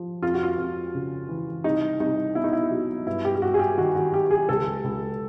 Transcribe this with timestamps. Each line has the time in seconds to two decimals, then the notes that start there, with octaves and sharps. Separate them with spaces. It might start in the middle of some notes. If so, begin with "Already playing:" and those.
Already playing: F3
0.23 F2 F4
0.34 F#4
0.43 F4
0.58 F2
0.94 C#3
1.29 E3
1.64 C2 D#4
2.00 C2 D#4
2.35 B2 E4
2.44 D#4
2.53 E4
2.71 F#3
3.06 G2 E4
3.25 G4
3.35 G4
3.42 G2 F#4
3.54 G#4
3.59 G4
3.78 D#3 F#4
3.95 F#4
4.13 F#3 G4
4.31 G#4
4.49 C#2 A4
4.84 C#2